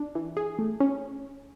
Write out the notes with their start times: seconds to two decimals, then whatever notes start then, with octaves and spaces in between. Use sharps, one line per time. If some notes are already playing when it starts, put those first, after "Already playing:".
Already playing: D4
0.15 E3
0.37 G#4
0.59 A3
0.80 C#4